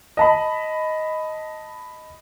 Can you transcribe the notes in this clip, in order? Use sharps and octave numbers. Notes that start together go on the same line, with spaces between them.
D#5 A5 B5